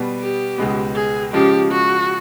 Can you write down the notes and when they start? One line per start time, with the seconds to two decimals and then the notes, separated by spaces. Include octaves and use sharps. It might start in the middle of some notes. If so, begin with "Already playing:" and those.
Already playing: B2 G3 B3
0.20 G4
0.58 C#2 B2 G#3 B3
0.96 G#4
1.33 C#3 F3 G#3 G4
1.71 F#4